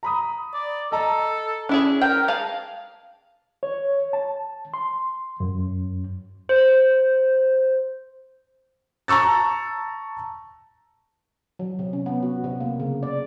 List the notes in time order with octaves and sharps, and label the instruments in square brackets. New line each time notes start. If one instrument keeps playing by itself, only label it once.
[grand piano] A#5 B5 D#6
[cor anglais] D5
[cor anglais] A4 [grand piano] D#5 A5 A#5
[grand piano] C#4 [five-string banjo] D4 E4 G#4
[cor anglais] A#4 [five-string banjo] G5
[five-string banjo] G#4 F5 A5
[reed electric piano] C#5
A5
C6
F#2
[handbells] C5
[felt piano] A5 A#5 C#6 E6 A6
[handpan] F#3
C3
C#4
B3
F#4
C3
A#3
C#3
D5